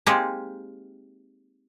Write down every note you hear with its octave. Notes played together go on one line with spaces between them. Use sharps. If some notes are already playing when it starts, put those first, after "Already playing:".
G#3 A#3 C4 D#4 G4 G#4